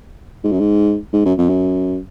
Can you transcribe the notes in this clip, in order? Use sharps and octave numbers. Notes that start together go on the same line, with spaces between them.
G#2
F#2
G#2
G#2
F#2
F2
F#2